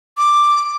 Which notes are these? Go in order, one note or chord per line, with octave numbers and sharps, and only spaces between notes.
D6